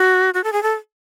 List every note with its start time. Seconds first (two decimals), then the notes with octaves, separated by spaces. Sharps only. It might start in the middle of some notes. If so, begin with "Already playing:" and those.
Already playing: F#4
0.34 F#4
0.44 A4
0.52 G#4
0.63 A4